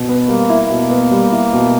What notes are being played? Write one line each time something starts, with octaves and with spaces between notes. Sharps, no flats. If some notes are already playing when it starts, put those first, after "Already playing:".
Already playing: B2
B3
G3 A#3
E4
B2 A#3
B3
G3
E4
B2